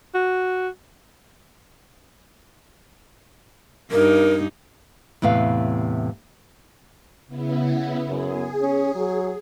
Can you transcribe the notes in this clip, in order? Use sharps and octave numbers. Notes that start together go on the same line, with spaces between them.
F#4
G2 D#4 A#4
E2 A2 C3 B4 F5
C#3 B3 E4
F#2 G#4
C#4
F#3